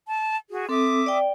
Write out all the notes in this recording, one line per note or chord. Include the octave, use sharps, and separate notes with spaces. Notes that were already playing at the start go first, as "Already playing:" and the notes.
A5
F#4 G#4
C4 A4 E5 D6 D#6
D5 G5